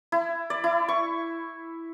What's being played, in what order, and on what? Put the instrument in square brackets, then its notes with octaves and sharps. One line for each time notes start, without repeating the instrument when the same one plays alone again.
[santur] E4
D5
E4
C#6